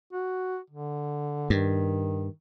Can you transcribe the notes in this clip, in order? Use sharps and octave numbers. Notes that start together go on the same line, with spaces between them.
F#4
D3
G2 D#3